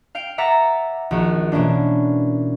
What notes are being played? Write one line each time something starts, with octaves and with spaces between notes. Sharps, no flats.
F5 G5 D7
E5 F#5 A#5 D6 A6
A#1 D#3 F#4
B2 E3 A#3 C#4 D4